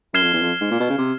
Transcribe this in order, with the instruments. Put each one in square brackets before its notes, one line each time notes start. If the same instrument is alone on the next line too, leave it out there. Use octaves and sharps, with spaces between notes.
[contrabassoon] F#2 [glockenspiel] F6 G#6 C7 E7 G7
[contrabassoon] F2
E2
F2
G#2
A#2
B2
C#3
C3